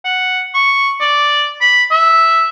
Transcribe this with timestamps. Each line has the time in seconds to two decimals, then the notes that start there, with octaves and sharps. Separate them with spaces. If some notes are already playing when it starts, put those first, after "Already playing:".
0.05 F#5
0.54 C#6
1.01 D5
1.61 B5
1.91 E5